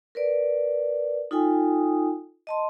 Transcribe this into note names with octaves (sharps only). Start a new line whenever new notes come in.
A#4 B4 D5
D#4 F4 A4 G5 G#5 D#6
D#5 A5 C6